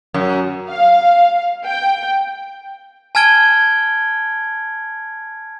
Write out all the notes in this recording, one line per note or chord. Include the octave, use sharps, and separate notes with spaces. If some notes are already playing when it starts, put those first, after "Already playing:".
F#2
F5
G5
G#5 A5 F6 G#6 D7 G7